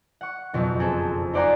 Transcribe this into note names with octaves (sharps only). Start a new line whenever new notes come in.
F#5 C#6
F#1 F2 B2
C4 G#4 A4
D#4 C5 D5 F#5 G#5 A#5